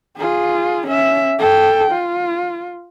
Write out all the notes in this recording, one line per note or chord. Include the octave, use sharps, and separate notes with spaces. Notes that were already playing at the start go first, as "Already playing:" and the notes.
F4 G#4
C#4 E5
A4 G5
F4